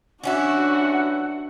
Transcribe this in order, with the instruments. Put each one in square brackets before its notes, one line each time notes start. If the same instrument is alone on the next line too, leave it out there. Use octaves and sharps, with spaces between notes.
[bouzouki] E3 C#4 E4 [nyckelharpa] D4 [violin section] F#4 [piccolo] F#5